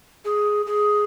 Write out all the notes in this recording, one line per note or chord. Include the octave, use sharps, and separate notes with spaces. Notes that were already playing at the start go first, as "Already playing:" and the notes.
G#4
G#4